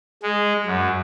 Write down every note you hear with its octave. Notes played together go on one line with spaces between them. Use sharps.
G#3
F#2